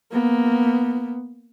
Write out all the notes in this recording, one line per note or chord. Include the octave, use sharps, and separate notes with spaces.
A#3 B3